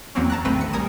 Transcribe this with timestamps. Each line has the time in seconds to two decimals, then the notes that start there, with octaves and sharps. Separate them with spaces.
0.15 E2 F#3 A#3 C4 C#4
0.30 A5 A#5 F#6
0.45 A1 D#3 A3 C4 B4 D#7
0.61 C#7
0.73 C2 G3 A#4 G#5 D#6 E7